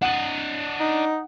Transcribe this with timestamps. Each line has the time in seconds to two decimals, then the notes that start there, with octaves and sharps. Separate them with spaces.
0.02 D4 D#5 F#5 F#7
0.80 D#4